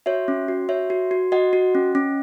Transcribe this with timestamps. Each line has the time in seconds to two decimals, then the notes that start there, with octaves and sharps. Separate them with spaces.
0.06 F#4 C#5 E5
0.28 C#4
0.48 F#4
0.69 F#4 C#5 E5
0.90 F#4
1.11 F#4
1.32 F#4 D#5 F#5
1.53 F#4
1.75 C#4
1.95 C#4